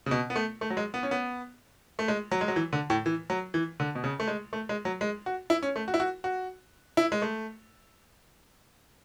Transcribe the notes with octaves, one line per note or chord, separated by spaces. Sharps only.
C#3
B2
B3
A3
A3
F#3
G#3
B3
C#4
B3
A3
G#3
F#3
G#3
F#3
E3
D3
A2
E3
F#3
E3
D3
B2
C#3
A3
G#3
A3
G#3
F#3
G#3
F#4
E4
C#4
A3
F#4
E4
F#4
F#4
E4
G#3
A3